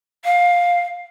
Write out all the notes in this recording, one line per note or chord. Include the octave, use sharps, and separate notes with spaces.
F5